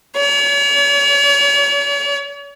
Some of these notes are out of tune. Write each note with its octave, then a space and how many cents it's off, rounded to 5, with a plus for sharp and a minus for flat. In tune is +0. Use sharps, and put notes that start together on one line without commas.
C#5 +45